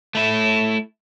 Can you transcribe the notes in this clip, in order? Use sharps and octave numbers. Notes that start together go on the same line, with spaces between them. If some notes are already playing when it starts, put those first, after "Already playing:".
A3 E4